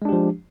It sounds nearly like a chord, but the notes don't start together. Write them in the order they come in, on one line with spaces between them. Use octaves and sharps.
G#3 D4 G4 F3